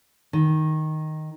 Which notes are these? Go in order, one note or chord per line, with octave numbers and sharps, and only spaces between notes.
D#3